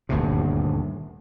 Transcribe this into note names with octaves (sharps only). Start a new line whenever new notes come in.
D#1 D2 G2 C3